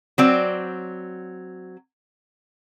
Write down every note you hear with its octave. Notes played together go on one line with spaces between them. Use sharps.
F#3 C4 D5